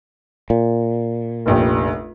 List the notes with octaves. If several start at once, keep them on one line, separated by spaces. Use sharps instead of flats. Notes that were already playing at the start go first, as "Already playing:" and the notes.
A#2
F1 A#1 G4